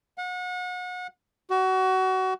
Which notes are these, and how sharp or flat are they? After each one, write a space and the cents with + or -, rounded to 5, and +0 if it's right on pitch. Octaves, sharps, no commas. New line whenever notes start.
F#5 -35
F#4 +25